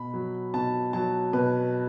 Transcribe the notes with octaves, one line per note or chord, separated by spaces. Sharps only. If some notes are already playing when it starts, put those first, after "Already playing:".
Already playing: B2 B5
F#3
B2 A5
F#3 A5
B2 B4